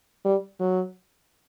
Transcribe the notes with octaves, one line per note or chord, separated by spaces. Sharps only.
G3
F#3